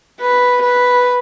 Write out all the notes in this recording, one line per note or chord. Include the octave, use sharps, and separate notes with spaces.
B4
B4